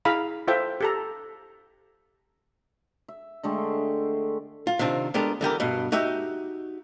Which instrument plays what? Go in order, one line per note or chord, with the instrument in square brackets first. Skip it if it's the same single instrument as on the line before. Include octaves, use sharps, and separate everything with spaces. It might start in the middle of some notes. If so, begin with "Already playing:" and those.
[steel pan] E4 G#4 F5 A#5 B5
F4 A4 C5 E5 G5
G4 A4 A#5
[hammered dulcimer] E5
D3 G#3 A3 G4
[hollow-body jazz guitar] F4
C3 D#3 C4 D4 F4
G#3 B3 D4 G4 A4 A#4
D3 E3 G4 A#4
G2 B2
D#4 F#4 G4 E5